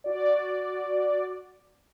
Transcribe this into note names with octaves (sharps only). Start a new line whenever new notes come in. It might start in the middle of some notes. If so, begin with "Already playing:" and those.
F#4 D5